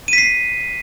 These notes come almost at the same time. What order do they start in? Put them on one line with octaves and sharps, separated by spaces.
D#7 B6 C7